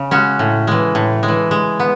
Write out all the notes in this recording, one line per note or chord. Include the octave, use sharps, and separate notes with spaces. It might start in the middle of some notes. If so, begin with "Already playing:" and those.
Already playing: C#3
G#3 C#4 F#4
A2
E3 G#3
A2
G#3
E3
G#3
B3